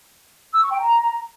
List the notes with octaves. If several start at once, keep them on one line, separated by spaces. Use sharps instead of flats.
E6
C#6
G5
A#5